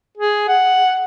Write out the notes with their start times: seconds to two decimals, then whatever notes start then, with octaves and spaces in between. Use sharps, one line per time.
0.17 G#4
0.48 F#5